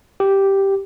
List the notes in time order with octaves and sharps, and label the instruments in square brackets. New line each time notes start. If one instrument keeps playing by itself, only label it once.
[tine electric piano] G4